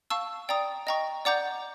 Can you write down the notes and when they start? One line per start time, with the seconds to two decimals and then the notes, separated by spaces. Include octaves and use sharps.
0.10 F5 A5 C#6 E6
0.49 D5 G5 A#5 D#6
0.87 D#5 G5 A#5 C#6
1.25 D5 F#5 A#5 D6 G6